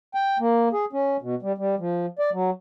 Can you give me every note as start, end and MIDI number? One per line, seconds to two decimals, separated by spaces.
0.15 0.38 79
0.39 0.69 58
0.73 0.85 68
0.93 1.17 61
1.22 1.35 47
1.42 1.52 55
1.58 1.75 55
1.79 2.06 53
2.19 2.30 74
2.32 2.50 54